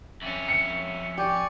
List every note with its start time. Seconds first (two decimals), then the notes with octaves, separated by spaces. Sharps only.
0.22 F2 C#4 E5
0.48 C#7
1.18 G4 D5 G#5 C#6